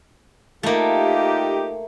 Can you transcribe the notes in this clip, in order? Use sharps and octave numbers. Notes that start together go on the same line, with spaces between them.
A3 A#3 D#4 F4 G4